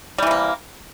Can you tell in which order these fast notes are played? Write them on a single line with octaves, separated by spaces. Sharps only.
G3 E3 C3 A#3